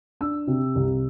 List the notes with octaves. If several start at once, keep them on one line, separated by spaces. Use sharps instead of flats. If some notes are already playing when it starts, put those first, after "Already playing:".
D4 E6
C3
C2